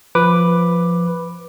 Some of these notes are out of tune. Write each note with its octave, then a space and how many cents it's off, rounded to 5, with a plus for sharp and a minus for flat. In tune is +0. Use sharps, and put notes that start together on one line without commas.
F3 +0 B4 +0 D6 +5